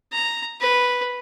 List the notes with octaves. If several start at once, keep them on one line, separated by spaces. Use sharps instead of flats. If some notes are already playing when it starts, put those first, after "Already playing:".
A#5
B4